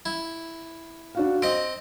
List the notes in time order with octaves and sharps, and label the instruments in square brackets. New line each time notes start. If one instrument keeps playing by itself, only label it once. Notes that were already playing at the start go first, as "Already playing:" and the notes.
[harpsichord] E4
[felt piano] D4 F#4 F5
[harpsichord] C4 D#5 [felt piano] D7